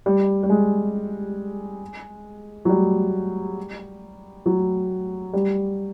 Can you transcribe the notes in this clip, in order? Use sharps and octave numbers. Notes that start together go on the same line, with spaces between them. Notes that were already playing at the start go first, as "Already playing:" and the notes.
G3
G3
G#3
F#3
G3
F#3
G3